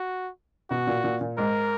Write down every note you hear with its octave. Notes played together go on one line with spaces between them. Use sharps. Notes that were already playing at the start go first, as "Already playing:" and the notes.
Already playing: F#4
B2 F#4
A#2
A#2
A#2
G#2 A#4